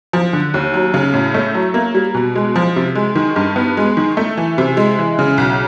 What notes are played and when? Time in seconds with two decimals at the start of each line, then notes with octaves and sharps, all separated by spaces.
0.13 F3
0.33 D3
0.54 D#2
0.74 F#3
0.94 C#3
1.13 A2
1.34 A3
1.54 F#3
1.74 A#3
1.94 G3
2.14 B2
2.35 G#3
2.56 F3
2.76 C3
2.95 G#3
3.15 D#3
3.36 G2
3.56 B3
3.77 G#3
3.97 D#3
4.17 A3
4.37 E3
4.58 C3
4.77 G#3
4.98 E3
5.19 C#3
5.38 B1